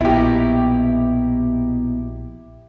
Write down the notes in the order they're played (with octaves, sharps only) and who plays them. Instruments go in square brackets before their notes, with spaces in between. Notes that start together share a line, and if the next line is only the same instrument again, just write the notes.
[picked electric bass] A#1 [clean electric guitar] B2 D#4 [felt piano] E4 G4